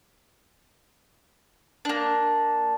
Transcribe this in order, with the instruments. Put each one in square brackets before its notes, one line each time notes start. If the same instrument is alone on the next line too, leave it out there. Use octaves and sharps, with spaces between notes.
[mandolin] A#3 D4